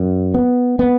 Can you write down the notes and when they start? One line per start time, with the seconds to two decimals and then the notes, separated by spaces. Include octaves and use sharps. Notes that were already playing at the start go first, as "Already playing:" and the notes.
Already playing: F#2
0.34 B3
0.79 B3